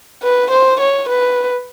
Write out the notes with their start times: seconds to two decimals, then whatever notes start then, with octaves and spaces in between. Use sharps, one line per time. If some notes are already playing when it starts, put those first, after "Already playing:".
0.23 B4
0.51 C5
0.80 C#5
1.09 B4